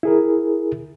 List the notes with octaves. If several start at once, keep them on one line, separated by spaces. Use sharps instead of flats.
E4 G#4 A#4